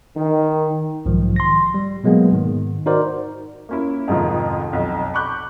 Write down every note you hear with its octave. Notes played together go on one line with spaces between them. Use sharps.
D#3
B1 G#2 D#3 F3
C6 A#6
G3
B2 F#3 G#3 A#3 B3 G#4
G#2 D#3
D#4 F#4 A#4 C5 D5
A#3 C#4 E4
F2 G#2 C3 D#3 F3
B1 F2
B5 C#6 D6 F#6 G6